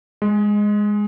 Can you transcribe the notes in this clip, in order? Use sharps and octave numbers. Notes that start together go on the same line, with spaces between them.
G#3